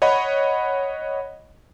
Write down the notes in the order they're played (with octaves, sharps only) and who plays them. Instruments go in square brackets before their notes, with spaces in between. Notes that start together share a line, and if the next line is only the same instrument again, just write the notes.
[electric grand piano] C#5 D#5 F#5 B5